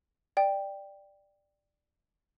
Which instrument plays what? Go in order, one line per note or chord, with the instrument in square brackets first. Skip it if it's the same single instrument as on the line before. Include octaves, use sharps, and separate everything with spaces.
[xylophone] D5 G5